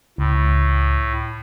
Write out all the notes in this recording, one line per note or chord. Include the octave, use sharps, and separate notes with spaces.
C#2 A2